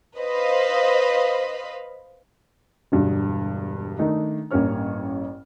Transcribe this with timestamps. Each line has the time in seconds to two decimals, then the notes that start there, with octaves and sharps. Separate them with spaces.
0.18 B4 C5 D#5 F5 B5
2.92 E1 G2 D3
3.99 D#3 A3 D4 D#4
4.51 A1 G2 A#3 C#4 C#5 F6